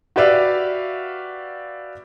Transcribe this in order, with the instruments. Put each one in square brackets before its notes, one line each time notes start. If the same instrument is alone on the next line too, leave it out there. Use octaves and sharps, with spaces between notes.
[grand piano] F#4 G4 B4 D5 E5 F5